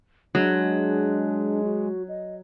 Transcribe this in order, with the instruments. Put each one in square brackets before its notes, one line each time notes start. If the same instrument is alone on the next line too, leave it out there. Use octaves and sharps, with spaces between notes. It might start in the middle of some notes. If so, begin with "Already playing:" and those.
[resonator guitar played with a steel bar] F#3 [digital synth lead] G#3 [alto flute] D4
[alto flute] F#4
D#5